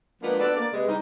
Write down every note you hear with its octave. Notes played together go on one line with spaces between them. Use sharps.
F3 G#3 A#3 B3 D4 F4
B3 D4 F#4 A4 D5
A#3 D5
C3 G#3 B4
G3 D#4